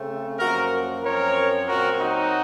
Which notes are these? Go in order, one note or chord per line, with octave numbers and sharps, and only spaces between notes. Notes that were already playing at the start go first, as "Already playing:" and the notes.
Already playing: C#3 A3 C4
F#2 F3 A#3 F#4 A#4
F#2 F3 C4 A#4 C#5
A#2 F#3 C4 F#4 A#4
D#4 F#4